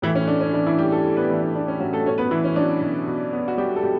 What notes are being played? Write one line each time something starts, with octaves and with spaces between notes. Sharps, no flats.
A2 E3 E4
C#4
A3 D4
C#4
E3 D4
E3 E4
A2 G3 G4
A3 A4
A2
B3 B4
E3 A3 E4
D4
E3 D4
C#4
A2 F#3 F#4
A3 A4
B2 C#4 C#5
B3 B4
E3 B3 E4
C#4
F#3 D4
B2
B2
B3
F#4
F#3 G3 G4
A4
B2 G3 G4